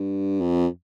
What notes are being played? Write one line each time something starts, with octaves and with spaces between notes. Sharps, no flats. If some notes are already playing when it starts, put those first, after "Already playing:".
Already playing: G2
F2